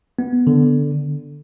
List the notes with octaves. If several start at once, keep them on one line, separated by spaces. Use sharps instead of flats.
B3
D3